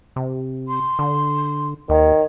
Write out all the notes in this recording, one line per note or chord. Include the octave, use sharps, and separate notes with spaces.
C3
C6
D3
D#2 D#3 C#5